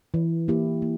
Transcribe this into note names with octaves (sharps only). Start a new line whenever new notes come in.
E3
A#3 E4 G4
A#3